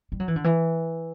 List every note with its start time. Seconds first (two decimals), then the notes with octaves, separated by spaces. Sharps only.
0.12 G3
0.20 F#3
0.28 E3
0.36 D3
0.44 E3